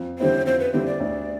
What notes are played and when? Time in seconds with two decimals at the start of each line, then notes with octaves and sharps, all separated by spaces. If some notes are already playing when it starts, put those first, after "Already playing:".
Already playing: F2
0.19 D3 G3 C4 E4 C5
0.46 F2 C5
0.60 B4
0.73 D3 G3 C4 E4 C5
0.86 D5
1.00 D2